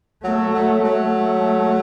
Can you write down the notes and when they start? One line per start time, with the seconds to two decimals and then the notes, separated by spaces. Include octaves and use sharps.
0.24 F#3 A3
0.54 F#3
0.83 F#3 A3